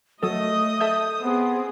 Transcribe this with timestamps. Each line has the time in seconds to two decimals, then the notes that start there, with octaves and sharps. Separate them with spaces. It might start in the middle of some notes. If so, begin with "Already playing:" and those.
0.23 F#3 A3 A4 D#5 D#6
0.81 A4 E5 G6
1.21 B3 C4 G#4